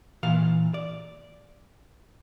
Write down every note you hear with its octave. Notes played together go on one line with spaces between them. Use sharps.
A#2 E3 F5 A5
D5